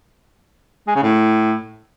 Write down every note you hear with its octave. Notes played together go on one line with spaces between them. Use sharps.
G#3
C#3
A2